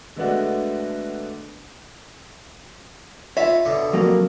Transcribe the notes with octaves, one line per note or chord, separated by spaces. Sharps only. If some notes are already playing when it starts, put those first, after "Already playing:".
D3 G#3 A3 B3 D4 F#4
F4 C#5 E5 B5
B2 D3
F2 F#3 A#3